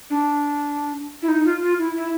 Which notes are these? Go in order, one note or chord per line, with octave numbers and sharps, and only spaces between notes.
D4
E4
D#4
F4
F4
E4
E4